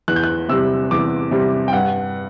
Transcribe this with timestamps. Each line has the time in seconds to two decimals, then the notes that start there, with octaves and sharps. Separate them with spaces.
0.08 E2 F#6
0.16 G6
0.24 F#6
0.49 C3 G3 E6
0.91 E2 D6
1.31 C3 G3
1.68 G5
1.73 G2 F#5